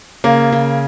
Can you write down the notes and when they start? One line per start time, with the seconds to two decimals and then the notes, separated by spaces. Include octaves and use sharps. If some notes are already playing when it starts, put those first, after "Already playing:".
0.24 C#3 A#3
0.52 C#3